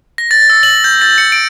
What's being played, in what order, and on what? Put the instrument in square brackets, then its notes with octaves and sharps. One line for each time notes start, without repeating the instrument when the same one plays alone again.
[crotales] A#6
A6
E6
F#7
G6
A6
C#7
D7